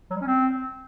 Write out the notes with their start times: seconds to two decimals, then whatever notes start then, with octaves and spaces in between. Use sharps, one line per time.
0.10 F#3
0.16 G3
0.21 C#4
0.26 C4